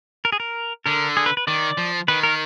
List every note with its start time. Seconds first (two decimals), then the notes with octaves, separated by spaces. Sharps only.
0.25 A#4
0.32 G#4
0.40 A#4
0.86 D3 A#4
1.17 G#4
1.26 B4
1.37 B4
1.47 D#3 D5
1.78 F3
2.08 D#3 B4
2.23 A#4